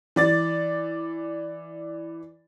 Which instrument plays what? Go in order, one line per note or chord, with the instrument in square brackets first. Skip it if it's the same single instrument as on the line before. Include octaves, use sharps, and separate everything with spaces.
[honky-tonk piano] E3 D5 A6